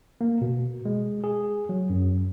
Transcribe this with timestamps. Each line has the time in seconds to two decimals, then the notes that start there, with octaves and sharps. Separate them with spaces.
0.21 A#3
0.41 B2
0.85 G#3
1.24 G#4
1.69 F#3
1.90 F#2